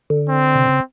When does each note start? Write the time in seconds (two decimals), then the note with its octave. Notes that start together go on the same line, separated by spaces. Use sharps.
0.10 D3
0.29 C4
0.55 C3
0.66 C#3